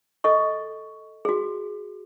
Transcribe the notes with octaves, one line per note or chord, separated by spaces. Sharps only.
A4 D#5 C#6
F#4 G#4